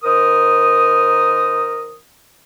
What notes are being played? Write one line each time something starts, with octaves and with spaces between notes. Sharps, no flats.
D#3 A#4 C5 D#6